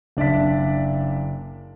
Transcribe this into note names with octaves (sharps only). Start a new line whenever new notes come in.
F#1 D4 D5 E5 B6